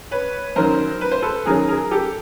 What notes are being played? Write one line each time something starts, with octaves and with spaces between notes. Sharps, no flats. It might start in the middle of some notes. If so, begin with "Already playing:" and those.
B4 C#5
F#2 D#3 F#3 A#4 C5
B4
C5
A4 B4
F#2 D#3 F#3 G#4 A#4
G#4 A#4
G4 A4